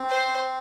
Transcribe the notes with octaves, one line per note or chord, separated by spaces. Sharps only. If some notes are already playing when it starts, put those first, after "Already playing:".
Already playing: C4
C5